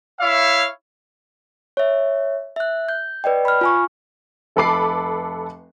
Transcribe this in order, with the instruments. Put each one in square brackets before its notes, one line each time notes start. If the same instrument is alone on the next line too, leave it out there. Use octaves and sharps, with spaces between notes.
[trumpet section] E4 C#5 E5 F5
[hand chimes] C#5 E5
E5 F#6
G6
B4 D5 D#5 G5
B5 F6
F4 G#5 C#6
[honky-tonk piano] F1 A4 B4 B5 D6 C7